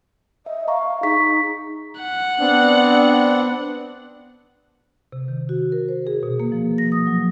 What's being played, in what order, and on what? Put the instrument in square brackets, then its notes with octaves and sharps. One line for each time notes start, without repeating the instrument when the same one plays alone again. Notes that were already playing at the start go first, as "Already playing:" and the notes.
[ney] D#5 [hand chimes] E5
[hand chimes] D#5 A#5 C#6 [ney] F5
[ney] D#4 [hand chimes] G#4 C#6 B6
[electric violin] F#5
[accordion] B3 C4 D4
[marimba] C3
D#3
F#4
A#4
C5
G#4
B2
A#3
F3
A#6
D#6
F#3